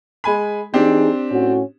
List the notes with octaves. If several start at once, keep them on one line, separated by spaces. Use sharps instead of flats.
G#3 G#5 B5
E3 C4 D4 D#4 G4 G#4
A2 C#4 F#4